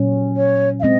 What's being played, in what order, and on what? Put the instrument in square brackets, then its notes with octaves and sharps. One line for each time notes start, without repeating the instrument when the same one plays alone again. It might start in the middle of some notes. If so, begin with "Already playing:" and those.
Already playing: [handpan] A#2 F#3 C#4
[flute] C#5
F5
[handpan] G#3 C4 [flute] D#5